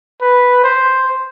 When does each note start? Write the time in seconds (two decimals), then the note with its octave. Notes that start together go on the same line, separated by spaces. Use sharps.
0.21 B4
0.64 C5